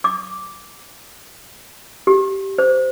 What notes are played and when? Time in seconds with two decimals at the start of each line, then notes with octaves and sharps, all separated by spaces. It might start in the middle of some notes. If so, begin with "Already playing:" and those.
0.04 D6
2.07 G4
2.58 C5